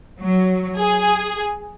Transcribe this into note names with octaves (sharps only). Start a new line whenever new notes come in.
F#3
G#4